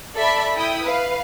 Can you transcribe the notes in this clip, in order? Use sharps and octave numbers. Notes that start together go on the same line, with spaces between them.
A4 D5 E5 A5 B5
E4 G5 D#6
B4 F5